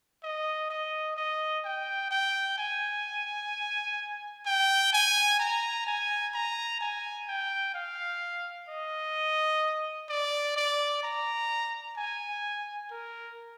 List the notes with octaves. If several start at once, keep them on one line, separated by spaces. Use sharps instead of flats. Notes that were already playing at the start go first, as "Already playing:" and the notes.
D#5
D#5
D#5
G5
G5
G#5
G5
G#5
A#5
G#5
A#5
G#5
G5
F5
D#5
D5
D5
A#5
G#5
A#4